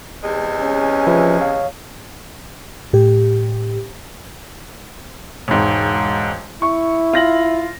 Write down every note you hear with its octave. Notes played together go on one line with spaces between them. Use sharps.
E2 C3 G#3
C#4
F3 B4 E5
C#5 F5
A2 G4
E1 G#2
E4 C#6
F4 A#6 F#7